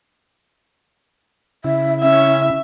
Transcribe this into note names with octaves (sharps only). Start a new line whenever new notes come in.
C#3 E4 E5
C#4 E5